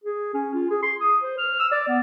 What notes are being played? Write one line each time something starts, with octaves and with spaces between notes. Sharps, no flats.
G#4
C#4
F4
G#4
C6
D#6
C5
F6
E6
D5
B3